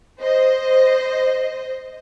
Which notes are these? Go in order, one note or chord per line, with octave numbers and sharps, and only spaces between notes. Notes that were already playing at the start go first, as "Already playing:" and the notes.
C5 D#5